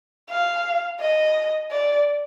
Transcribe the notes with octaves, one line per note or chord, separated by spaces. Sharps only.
F5
D#5
D5